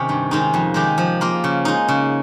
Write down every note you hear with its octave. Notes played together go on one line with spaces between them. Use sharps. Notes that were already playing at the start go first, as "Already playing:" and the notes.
Already playing: C3 D#3 C#4 D#4
G2
D#3 G#3 D#4
F2
D#3 G#3 D#4 G4
F3
A#3 F4
C#3
G#3 D#4
C#3